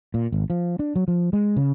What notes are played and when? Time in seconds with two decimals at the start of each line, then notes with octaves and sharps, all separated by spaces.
0.14 A#2
0.32 G#1
0.50 F3
0.79 D4
0.96 F#3
1.08 F3
1.33 G#3
1.57 C#3